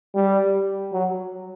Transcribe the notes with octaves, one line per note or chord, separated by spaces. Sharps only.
G3
F#3